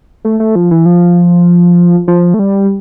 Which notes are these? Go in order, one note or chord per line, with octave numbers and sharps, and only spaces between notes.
A3
A3
F3
E3
F3
F3
A3
G3